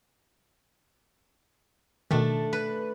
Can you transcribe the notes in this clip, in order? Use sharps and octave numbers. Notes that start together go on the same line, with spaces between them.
B2 D#3 A3 D4
B4